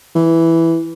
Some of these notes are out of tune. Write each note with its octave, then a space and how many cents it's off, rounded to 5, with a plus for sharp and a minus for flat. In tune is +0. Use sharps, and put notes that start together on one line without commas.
E3 +0